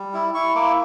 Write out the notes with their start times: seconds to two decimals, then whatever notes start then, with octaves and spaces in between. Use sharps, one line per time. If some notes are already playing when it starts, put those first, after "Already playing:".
Already playing: G3
0.14 E4
0.35 E4 C#6
0.55 A#3 D6